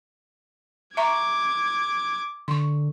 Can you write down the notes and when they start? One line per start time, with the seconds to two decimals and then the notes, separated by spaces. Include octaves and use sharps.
0.97 E5 A#5 C#6 D6 G#6
2.48 D3 C6 C#6